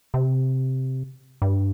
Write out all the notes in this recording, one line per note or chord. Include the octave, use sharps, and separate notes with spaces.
C3
G2